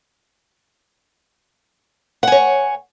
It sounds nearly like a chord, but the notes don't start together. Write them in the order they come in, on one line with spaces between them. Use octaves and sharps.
F#5 G#5 C#5